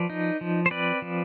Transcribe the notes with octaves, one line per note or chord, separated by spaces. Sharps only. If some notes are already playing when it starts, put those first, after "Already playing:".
Already playing: F3 B4 D5
D#4
F3
C5
C4 B4 D5
F3